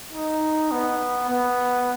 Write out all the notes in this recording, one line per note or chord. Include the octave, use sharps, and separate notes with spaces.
D#4
B3
B3